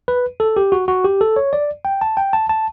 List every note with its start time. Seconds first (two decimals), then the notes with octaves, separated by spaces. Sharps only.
0.08 B4
0.40 A4
0.57 G4
0.72 F#4
0.88 F#4
1.04 G4
1.21 A4
1.36 C#5
1.53 D5
1.85 G5
2.01 A5
2.17 G5
2.33 A5
2.49 A5